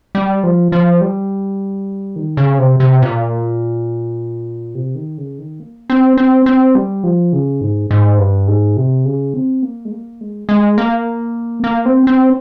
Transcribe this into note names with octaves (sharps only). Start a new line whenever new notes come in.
G3
F3
F3
G3
D#3
C#3
C3
C3
A#2
C3
D#3
C#3
D#3
A#3
C4
C4
C4
G3
F3
C#3
G#2
G#2
G2
G#2
C3
C#3
C4
A#3
G#3
A#3
G#3
G#3
A#3
A#3
C4
C4